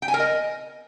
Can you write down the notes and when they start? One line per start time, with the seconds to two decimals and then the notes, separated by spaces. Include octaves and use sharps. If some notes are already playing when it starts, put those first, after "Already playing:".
0.02 G5
0.08 G#5
0.14 A#4
0.20 D#5